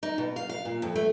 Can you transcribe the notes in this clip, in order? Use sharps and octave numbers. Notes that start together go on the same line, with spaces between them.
D#4
B2
F5
F5
A#2
F2
A3